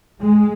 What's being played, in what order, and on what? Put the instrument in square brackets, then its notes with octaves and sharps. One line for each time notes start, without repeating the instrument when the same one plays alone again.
[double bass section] G#3